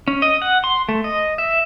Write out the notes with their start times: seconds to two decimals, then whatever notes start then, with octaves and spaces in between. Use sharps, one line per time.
0.08 C#4
0.22 D#5
0.42 F#5
0.64 C6
0.89 A3
1.04 D#5
1.38 E5